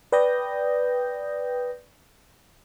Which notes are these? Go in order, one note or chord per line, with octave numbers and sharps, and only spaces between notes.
B4 D5 G5 D#6 G6 A#6